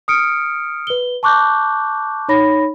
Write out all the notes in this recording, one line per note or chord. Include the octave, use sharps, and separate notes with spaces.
D#6 F6 C#7 D7
B4 G7
A5 C#6 D6 F#6 G6
D#4 C#5 B5 A#6